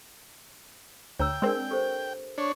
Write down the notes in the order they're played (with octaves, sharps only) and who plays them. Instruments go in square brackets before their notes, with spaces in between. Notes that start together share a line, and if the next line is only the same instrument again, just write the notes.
[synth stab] D2 [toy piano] C#5 A#5 E6 [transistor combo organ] G5
[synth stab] G#3 C4 [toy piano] D4 A#4 D5
[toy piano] G4 A4 C5
[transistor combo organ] D4 C#5 [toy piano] C#6